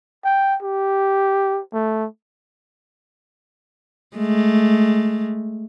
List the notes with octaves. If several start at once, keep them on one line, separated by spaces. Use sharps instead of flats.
G5
G4
A3
G#3 A3